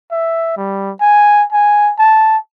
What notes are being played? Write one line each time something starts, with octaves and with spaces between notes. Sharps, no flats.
E5
G3
G#5
G#5
A5